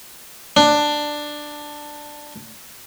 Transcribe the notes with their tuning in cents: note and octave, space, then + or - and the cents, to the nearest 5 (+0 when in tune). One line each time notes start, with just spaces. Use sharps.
D4 +10